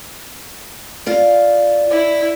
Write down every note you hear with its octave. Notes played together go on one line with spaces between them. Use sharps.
F4 D5 F5
E4